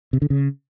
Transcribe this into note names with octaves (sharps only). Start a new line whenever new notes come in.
C3
D3
C#3